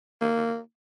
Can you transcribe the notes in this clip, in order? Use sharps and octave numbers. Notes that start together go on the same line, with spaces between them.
A#3